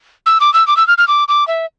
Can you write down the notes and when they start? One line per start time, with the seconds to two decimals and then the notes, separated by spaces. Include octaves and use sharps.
0.26 E6
0.40 D6
0.54 E6
0.67 D6
0.77 E6
0.88 F6
0.98 F6
1.08 D6
1.28 D6
1.47 E5